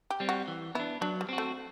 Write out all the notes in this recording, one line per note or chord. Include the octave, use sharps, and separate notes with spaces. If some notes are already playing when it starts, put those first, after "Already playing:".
G4
G3 C4
F#4
E3
B3 D4 E4
F#3 D4
G3
C4 F#4
A3